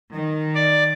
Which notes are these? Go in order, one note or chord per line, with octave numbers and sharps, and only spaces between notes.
D#3
D5